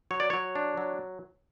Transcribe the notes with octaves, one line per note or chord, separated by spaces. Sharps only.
F#3 C#5
D5
F#3 C#5
D4
F#3